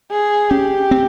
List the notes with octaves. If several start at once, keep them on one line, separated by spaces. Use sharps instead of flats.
G#4
C#4 G4
C4